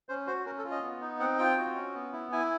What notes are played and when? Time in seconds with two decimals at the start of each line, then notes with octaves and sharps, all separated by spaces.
0.09 C#4 C5
0.27 F#4 C5
0.46 C#4 A#4
0.58 A4
0.64 F4
0.71 D#5
0.83 B3
1.01 D#4
1.20 C4 F#5
1.38 F4 G5
1.58 F#4
1.76 C#4
1.95 B3
2.13 E4
2.32 E4 G#5